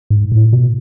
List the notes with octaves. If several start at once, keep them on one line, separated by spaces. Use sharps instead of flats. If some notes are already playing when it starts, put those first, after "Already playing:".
G#2
A2
B2